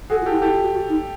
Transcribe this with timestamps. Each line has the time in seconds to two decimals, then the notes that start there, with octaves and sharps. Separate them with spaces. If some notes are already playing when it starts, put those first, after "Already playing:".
0.10 F#4 G#4 A4
0.21 F4
0.26 E4 G4 A4
0.42 E4 G4 A4
0.53 F4
0.62 F#4
0.73 F#4
0.89 D#4